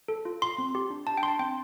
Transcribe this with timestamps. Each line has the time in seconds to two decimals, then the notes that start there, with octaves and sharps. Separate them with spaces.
0.08 A4
0.25 F4
0.42 F4 C6
0.58 C4
0.75 G4
0.90 D4
1.07 D4 A5
1.17 G5
1.22 D4 C6
1.28 A5
1.39 C4 G5